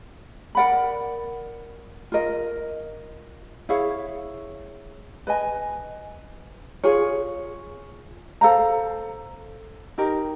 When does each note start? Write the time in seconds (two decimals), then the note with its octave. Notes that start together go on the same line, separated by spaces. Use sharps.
0.55 A#4 D5 F#5 B5
2.12 F4 A#4 D#5
3.69 E4 G#4 C#5 F5
5.27 B4 D#5 G#5
6.84 F4 G#4 C#5
8.41 A4 C5 F5 A#5
9.98 D#4 G4 A#4